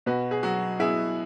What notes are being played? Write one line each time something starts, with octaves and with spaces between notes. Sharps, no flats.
B2 F#4 B4
G#4
F#3 F#4
B3 E4 G#4